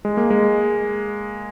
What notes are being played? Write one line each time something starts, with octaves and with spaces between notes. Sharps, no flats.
G#3
A#3
G#3